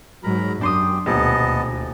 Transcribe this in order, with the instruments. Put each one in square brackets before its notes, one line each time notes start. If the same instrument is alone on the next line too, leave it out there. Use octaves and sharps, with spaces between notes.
[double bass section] G#2 F#3 [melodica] A#4 A#5 B5
[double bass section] F#2 [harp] D4 C6 D#6 [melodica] G4 G5
[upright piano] D#1 [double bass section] D2 B2 [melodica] B3 D#5 A5